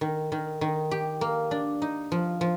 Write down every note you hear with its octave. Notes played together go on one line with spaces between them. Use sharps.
D#3
D#3
D#3
G4
A#3
D4
D#4
F3
F3